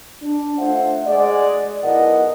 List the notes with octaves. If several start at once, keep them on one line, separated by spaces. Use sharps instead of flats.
D4
A3 F4 C5 E5 F#5
G#3 F#4 G#4 D5
B1 B2 E4 A#4 D#5 F#5